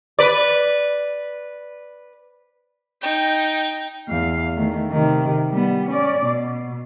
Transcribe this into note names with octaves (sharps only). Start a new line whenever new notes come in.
B4 D5
D#4 G5
E2 F5
D#3 A3
C3 D#3
G3 B3
C#4 D5
B2